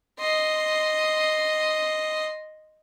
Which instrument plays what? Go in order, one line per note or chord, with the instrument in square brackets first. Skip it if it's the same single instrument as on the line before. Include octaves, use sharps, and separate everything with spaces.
[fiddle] D#5 C6